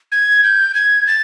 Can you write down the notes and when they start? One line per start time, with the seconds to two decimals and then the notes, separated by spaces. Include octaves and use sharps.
0.12 G#6
0.44 G6
0.75 G#6
1.07 A6